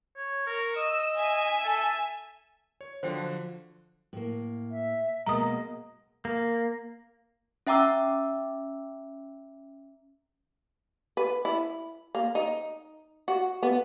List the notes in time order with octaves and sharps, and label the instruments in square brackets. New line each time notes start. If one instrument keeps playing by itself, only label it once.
[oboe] C#5
[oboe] A#4 [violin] C#6
[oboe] D#5 [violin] E6
[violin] E5 G#5
[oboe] A4
[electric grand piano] C#5
[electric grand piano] D3 F3 F#3 [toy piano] C5 G5
[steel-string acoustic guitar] A2 A#3
[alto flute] E5
[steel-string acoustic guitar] B2 G#3 A#3 [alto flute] D#5 [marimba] A#5 D#6
[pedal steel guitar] A#3
[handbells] C#4 E5 G5 A#5 D6 E6
[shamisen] B4
E4
A#3
D#4
F#4
B3